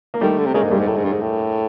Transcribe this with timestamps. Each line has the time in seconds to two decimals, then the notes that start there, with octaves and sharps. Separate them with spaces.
0.14 A#3
0.21 D#3 G3 A3
0.38 D3
0.46 C3
0.54 C#3 G#3 A#3
0.63 G#2
0.71 G2 G3 A3
0.80 G#2
0.88 A2
0.96 G#2
1.05 G2
1.13 G#2
1.21 A2